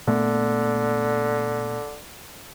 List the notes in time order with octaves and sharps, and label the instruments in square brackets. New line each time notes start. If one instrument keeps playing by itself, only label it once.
[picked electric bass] A#2 A3 B3 [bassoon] D3